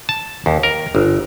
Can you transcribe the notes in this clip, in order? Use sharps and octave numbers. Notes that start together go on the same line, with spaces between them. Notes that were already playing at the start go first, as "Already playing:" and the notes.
A5
D#2
A#4
G1